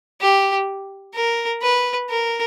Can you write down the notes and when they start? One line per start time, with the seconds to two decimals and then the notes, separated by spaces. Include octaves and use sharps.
0.21 G4
1.15 A#4
1.62 B4
2.10 A#4